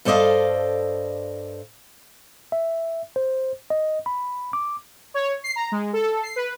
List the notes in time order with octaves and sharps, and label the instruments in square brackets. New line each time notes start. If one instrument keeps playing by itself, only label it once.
[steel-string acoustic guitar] G2 A4 C5 D5 D#5 F5
[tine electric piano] E5
C5
D#5
B5
D6
[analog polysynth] C#5
C7
A#5
G#3
A4
C7
B4